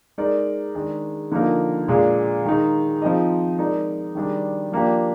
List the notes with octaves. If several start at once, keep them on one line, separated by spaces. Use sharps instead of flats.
G#3 D#4 A#4 D5
D#3 G#3 D4 G#4
D3 F3 A#3 D#4 A#4
A#2 G#3 D4 G#4
D#3 G#3 D#4
F3 C4 D#4 G#4 D#5
G#3 D#4 A#4 D5
D#3 G3 D4 G#4
F3 A#3 D4 G4